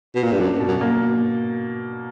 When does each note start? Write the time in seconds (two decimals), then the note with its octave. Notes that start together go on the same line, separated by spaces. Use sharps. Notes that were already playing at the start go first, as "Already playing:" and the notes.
0.15 B2
0.23 A#2
0.32 G2
0.40 F#2 D4
0.60 B2
0.68 F#2
0.81 A#3